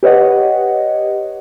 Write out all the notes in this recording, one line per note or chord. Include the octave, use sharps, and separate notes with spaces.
G4 B4 C#5 D#5 F#5